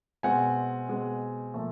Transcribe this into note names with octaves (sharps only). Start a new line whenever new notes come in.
B2 G#3 C4 F#5 G#5
B2 G#3 C4
A#2 F3 A3